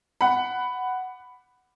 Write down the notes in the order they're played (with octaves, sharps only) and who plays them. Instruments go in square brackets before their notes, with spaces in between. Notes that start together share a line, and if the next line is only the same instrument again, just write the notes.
[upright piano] F#5 B5